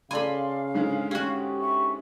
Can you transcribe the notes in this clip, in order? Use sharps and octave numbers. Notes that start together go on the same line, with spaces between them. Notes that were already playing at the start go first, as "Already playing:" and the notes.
C#3 A4 D5 F5 G#5 B5 C6
G#2 D3 G#3
C#4 F#4 G4
E5 C#6